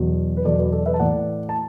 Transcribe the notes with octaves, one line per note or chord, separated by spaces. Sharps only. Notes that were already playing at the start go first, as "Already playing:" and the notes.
Already playing: E2 B2 F#3
B4
E2 B2 F#3 A4 D5
F#4 B4
A4 D5
B4 E5
A5
A2 E3 D5 F#5
A5